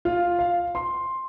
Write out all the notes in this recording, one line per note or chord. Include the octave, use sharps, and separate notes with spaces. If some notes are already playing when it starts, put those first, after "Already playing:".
F4
F5
C6